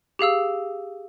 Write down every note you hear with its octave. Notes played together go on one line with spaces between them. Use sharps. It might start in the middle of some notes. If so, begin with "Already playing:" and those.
G4 G#4 F5 E6